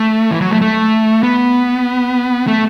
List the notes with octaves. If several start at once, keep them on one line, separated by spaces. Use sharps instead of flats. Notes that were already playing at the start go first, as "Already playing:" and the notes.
Already playing: A3
E3
F#3
A3
A3
B3
A3